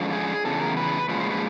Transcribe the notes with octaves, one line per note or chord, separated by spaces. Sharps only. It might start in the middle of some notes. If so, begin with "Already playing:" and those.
Already playing: D3 F3 G#3 C#4
G#4
E2 C#3 A4
A#4
B4
A#2 F3 G#3 C#4 B4
C5
B4